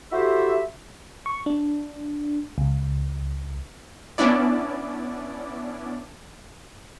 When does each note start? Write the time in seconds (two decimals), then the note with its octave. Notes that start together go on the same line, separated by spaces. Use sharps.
0.12 E4 F#4 G4 A4 C5 E5
1.26 C#6
1.46 D4
2.58 C#2
4.18 B3 C#4 D4 E4 D5